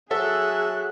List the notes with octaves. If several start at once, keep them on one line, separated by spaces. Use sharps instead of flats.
F#3 G#4 A4 E5 F#6